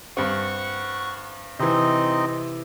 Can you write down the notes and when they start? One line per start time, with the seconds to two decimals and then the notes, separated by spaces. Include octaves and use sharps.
0.17 G2 C4 F#5 C#6
1.59 C3 E3 C4 D#4 D#5